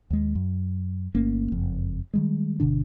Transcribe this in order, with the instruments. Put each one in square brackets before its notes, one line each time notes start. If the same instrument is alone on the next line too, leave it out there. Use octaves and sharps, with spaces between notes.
[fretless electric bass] D#2 G#3
F#2
G1 A3 A#3 C#4
F#1 F2
D#3 G3 G#3
G1 B2 D3 D4